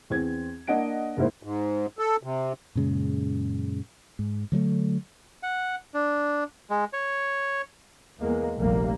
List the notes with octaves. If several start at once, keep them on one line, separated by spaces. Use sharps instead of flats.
E2 C4 G#6
A#3 D4 D#5 F#5 D7
F#1 G#2 A#3 E4 C5
G#2
A4
C3
F#2 A#2 C#3 G#3
G#2
D3 F#3 G3 A3
F#5
D4
G#3
C#5
E2 G#3 A#3
F1 A#1 G3 A#3